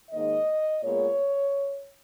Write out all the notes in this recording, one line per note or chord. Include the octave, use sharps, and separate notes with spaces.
G#2 D#3 A#3 D#5
A#2 G#3 B3 C#5